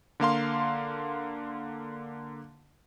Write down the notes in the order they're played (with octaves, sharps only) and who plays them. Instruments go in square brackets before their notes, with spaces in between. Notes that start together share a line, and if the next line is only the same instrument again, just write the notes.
[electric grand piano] D3 A#3 F5 C6